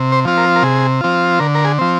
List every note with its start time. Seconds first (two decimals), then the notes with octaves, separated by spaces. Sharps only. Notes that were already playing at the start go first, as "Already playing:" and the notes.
Already playing: C3
0.12 C5
0.25 F3 C4 F4
0.38 A#4
0.56 A#4
0.63 C3 G#4
1.01 F3 C4 F4
1.39 D3 A#4
1.55 A#4
1.65 G#4
1.78 F3 C4